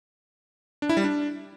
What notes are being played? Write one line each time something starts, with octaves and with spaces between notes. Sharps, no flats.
D4
E4
G3
D4